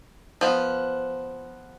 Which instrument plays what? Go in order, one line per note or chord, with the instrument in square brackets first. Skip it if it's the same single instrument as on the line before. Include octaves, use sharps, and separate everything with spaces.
[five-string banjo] F3 B3